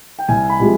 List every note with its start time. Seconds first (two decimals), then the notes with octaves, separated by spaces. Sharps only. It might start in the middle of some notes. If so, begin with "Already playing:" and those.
0.19 G5
0.28 C2 G#5
0.50 B5
0.60 C3 F3 G#3